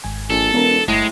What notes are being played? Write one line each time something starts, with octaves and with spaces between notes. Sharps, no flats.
G#1 G#5
A#1 A4
E1 B3 C#4 A#4
G1 A2 G#3 A#6